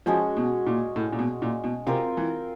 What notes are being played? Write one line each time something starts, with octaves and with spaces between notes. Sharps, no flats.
F3 G#3 C#4 F#4
B2
A#2
A2
A#2
B2
A#2
B2
C3 C4 F4 A#4
E3